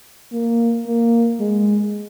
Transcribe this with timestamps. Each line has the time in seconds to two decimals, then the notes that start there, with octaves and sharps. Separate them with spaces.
0.32 A#3
0.87 A#3
1.40 G#3